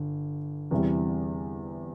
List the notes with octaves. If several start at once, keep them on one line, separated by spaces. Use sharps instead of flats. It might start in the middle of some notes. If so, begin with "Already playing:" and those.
Already playing: G1
E2 C3 E3 G3